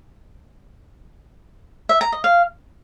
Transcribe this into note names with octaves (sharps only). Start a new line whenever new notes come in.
E5
A#5
D#5
F5